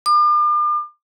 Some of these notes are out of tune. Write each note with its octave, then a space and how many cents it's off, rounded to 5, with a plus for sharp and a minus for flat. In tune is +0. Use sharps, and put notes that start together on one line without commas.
D6 +40